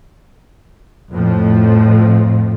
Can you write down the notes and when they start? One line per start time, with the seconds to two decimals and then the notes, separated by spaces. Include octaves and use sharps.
1.12 F2 A2 F3